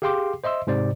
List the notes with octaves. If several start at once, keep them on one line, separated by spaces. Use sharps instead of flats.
G4 G#4 F5 G5 C6 D6
C5 D#5 E5 C6 E6
G#2 C3 C5 D5